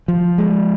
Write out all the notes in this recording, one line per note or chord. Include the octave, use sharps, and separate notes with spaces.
F3
G#3